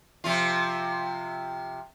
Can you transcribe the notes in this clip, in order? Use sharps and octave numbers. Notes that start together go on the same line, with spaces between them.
C3 F3 F4